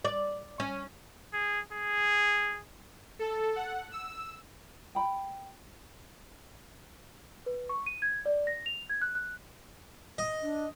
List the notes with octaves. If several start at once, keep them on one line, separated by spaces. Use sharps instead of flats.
D5
C#4
G#4
G#4
A4
F#5
E6
G5 B5
B4
C#6
D#7
G#6
D5
A#6
F7
G#6
F#6
F#6
D#5
D4